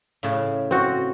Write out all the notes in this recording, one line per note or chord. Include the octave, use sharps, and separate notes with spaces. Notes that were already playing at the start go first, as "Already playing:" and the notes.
A2 C#3
C4 F#4